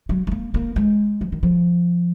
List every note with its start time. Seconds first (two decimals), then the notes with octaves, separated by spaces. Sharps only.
0.09 F#3
0.27 G#3
0.31 A#3
0.54 A#3
0.76 G#3
1.21 F3
1.32 D#3
1.43 F3